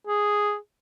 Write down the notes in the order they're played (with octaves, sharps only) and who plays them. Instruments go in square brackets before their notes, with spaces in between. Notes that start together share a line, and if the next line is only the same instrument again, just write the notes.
[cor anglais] G#4